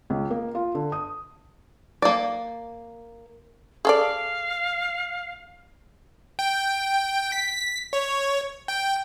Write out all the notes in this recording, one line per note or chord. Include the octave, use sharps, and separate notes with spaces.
C#2
A#3
F4
D3
D#6
A#3 D5
G#4 A4 D5 F5
G5
B6
C#5
G5